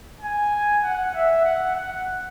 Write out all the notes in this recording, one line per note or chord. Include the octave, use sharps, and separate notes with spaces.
G#5
F#5
E5
F#5
F#5